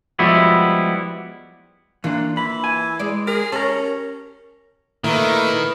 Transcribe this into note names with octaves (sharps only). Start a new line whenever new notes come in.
F3 G3 G#3 B3 E4 F#4
E3 A#3 D4 F4
E3 B5
G#5
G#3 D5
G#4 A#4
C#4 G4 A#4 A5
A#2 D#3 A3 E4 A#4 B4